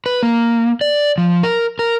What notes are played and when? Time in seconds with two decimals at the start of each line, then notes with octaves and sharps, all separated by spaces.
0.06 B4
0.23 A#3
0.81 D5
1.18 F3
1.43 A#4
1.79 A#4